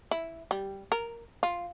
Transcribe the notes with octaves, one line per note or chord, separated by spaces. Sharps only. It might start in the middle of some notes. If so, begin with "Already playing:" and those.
E4
G3
A#4
F4